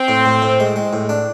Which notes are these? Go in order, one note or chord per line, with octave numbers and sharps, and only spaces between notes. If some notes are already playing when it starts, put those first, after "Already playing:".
Already playing: C4
A2
A2
A2
G#3
G#3
A2
D4